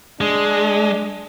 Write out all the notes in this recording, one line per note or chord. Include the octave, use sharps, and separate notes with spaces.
G#3 D4